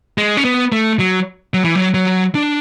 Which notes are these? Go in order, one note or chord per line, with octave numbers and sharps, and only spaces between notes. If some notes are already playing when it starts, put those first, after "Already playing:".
G#3
C#4
B3
A3
F#3
F#3
E3
F#3
F#3
D4